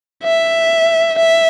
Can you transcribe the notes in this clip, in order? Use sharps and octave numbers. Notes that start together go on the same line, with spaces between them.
E5
E5